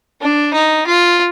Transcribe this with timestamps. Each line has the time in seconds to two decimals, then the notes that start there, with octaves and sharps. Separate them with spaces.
0.21 D4
0.53 D#4
0.86 F4